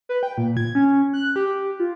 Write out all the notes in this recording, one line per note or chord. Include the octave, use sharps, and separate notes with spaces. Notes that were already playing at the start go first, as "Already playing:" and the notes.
B4
G5
A#2
G#6
C#4
F#6
G4
F4